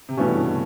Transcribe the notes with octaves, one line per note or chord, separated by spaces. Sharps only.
C3
G2 B2 E3 A3 C#4 F#4
C#3